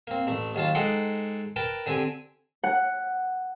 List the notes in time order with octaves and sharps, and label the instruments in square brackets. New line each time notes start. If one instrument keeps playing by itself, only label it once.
[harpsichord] A#3 C4
A1 A3
D#2 F#3 F4 A5
G#3 D#4 A4 C5 F#5 G5
A#4 B4 G5 A5
D3 C4 G4 G#5
[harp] F#5